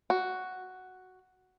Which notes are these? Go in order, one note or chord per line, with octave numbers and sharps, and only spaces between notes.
F#4